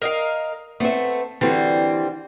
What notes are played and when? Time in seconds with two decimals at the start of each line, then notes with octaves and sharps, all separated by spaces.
0.02 A#4 D#5 F5
0.80 A3 B3 C4 E5
1.41 D3 E3 G3 C4 F#4